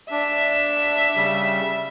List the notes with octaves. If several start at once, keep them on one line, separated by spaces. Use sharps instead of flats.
D4 E5
C#3 G3